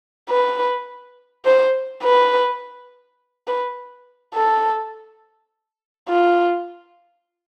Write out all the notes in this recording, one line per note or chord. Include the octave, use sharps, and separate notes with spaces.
B4
C5
B4
B4
A4
F4